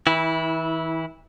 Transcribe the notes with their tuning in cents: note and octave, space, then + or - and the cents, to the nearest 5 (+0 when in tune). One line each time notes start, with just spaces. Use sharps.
E3 -35 E4 -10